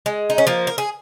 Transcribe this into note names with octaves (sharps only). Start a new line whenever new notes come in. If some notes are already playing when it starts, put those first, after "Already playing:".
G#3
D#4
C#4
F3 A#3
A#4
G#4